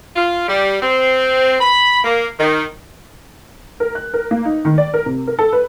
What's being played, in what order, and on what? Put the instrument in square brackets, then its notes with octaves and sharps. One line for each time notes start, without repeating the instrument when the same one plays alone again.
[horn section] F4
G3
C4
B5
A#3
D#3
[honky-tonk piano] A#4
F#6
A#4
A#3
D#4
D#3
D5
A#4
C3
A#4
A4
B4